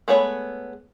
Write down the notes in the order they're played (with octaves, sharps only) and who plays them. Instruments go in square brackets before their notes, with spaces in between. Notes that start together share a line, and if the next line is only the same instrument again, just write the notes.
[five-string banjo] G#3 A3 B3 C#5 B5